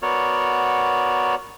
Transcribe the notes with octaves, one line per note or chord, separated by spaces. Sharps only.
B3 F#4 A#4 C#5 D5